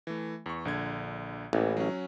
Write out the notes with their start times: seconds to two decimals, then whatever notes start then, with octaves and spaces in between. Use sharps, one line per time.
0.07 E3 A3
0.46 E2 C#6
0.65 A#1 D3 G#6
1.53 A1 E3 A#3 E4
1.77 F#3 C#4